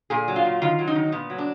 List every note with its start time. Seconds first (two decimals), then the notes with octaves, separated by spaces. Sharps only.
0.10 A#2 G#4
0.28 F#3
0.36 F4
0.45 A#2
0.62 D#3 F4
0.79 F#3
0.87 D#4
0.95 D#3
1.12 A#2 B3
1.30 F#3
1.38 D4